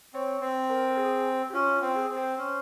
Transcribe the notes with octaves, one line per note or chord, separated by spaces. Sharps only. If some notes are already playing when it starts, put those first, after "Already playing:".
C4 C#5
C4 C5
A#4
A#4
G#4
G4
C#4 F4
F4
C4
G#4
C4
C5
C#4